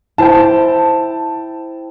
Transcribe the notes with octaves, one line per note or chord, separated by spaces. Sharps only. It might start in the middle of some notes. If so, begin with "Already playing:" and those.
E4 C5 G5 A5